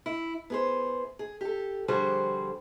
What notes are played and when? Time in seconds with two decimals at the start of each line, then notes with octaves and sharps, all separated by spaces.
0.06 E4
0.50 B3 G#4 C5
1.19 G#4
1.41 G4 A4
1.88 D3 F3 G3 F#4 G#4 C5